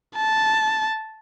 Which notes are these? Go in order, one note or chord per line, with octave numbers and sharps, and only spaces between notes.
A5